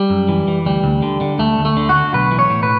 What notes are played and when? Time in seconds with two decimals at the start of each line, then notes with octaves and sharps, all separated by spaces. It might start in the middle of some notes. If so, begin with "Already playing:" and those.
Already playing: G3
0.10 F#2
0.29 E3
0.48 E3
0.66 D2 G3
0.84 D2
1.02 D3
1.21 D3
1.39 D2 A3
1.59 D2
1.65 A3
1.77 D3
1.89 F#4
1.96 D3
2.14 B1 B4
2.32 E3
2.39 C#5
2.50 A2
2.63 B4